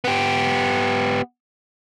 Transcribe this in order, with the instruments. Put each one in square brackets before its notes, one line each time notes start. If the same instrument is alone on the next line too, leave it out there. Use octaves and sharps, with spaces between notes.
[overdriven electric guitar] B3 G4